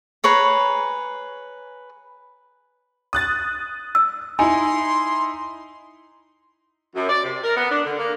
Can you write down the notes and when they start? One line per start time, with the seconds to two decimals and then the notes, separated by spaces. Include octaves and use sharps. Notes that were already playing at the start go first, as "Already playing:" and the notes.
0.24 G#4 B4 C#5 A#5
3.13 D#6 F#6 A6
3.95 E6
4.39 D#4 E4 G#5 C6
6.95 F#2
7.09 D5
7.23 C3
7.44 A#4
7.56 B3
7.70 D4
7.84 D3
7.98 A#3